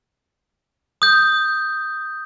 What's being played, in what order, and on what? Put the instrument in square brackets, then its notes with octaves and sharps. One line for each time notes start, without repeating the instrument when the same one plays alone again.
[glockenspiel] D#6 G6